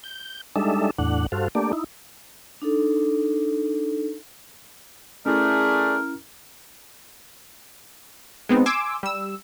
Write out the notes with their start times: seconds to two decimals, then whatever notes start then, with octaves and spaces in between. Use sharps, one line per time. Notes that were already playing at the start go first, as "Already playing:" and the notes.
0.04 G6
0.56 G3 G#3 D4 D#4 A4 E5
0.98 E2 A2 D4 F#5
1.32 G2 F#4 A4 C5 F5
1.55 A3 A#3 D4 G4 D5
1.73 D#4 E4
2.62 D4 D#4 A4
5.26 A3 C#4 E4 G#4 A#4 D5
8.49 G#3 B3 C4 D#4
8.66 G#5 C6 D6 E6
9.03 G3 E6